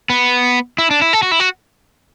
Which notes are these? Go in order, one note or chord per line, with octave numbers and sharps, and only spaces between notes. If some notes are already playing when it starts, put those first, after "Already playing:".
B3
E4
D4
E4
A4
F#4
E4
F#4